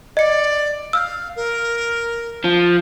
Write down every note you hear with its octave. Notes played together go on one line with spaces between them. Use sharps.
D5 D#5 C#7
F5 E6 F6 G6
A#4
F3